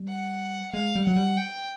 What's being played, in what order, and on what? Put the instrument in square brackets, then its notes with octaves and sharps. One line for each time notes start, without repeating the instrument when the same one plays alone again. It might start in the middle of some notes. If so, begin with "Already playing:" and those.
Already playing: [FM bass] G3
[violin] F#5
[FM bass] G#3 [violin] F5
[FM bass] G3
[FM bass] F#3 [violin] F#5
[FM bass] G3
[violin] G5